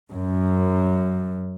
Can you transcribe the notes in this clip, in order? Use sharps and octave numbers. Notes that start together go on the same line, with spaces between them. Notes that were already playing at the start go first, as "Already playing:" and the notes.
F#2